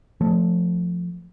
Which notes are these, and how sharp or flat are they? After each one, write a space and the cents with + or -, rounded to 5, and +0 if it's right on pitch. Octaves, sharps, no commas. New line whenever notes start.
F3 +10 A3 +0